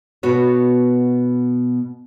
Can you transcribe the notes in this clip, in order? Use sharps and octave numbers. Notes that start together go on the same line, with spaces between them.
B2 B3 F#4 C#5